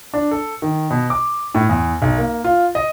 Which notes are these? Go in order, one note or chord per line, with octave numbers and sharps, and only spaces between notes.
D4
A4
D#3
B2
D6
A2
E2
B1
A#3
F4
D#5